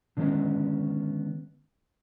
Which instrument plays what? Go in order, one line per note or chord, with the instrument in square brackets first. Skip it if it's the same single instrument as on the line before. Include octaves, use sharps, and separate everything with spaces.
[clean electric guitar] D3 D#3 G#3 B3 C#4